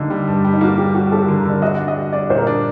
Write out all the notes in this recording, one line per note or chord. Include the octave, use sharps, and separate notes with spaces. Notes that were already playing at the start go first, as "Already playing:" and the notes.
Already playing: D3 G3 A#3 D#4
G3
G2
G3
D#4
A#3 F#4
G3 G4
G3 F#4
G3 A4
A#4
D3
A#4
D3 D5
F#4 D#5
D4
D#5
G3
D4 D5
A#2 C5
A#4
D4